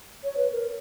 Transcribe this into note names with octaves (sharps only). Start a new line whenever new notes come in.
C#5
B4
A#4